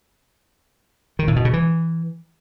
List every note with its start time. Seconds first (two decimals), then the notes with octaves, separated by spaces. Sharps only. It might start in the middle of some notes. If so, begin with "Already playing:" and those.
1.19 D#3
1.28 A2
1.36 B2
1.45 C#3
1.53 E3